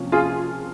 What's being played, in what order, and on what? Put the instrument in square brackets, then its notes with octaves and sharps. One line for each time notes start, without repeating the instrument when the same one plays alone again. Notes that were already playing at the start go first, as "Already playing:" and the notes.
Already playing: [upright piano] C3 F3 A#3 C#4
[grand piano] F4 G#4